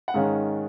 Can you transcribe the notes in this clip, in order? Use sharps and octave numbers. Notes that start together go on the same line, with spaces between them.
F#5
G#2 D#3 G#3 C#4 F5